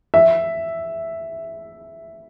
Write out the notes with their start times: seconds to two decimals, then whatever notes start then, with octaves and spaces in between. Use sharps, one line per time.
0.14 E5